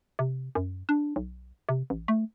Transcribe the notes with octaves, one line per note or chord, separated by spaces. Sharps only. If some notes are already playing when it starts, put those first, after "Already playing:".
C3
F#2
D4
B1
C3
A1
A3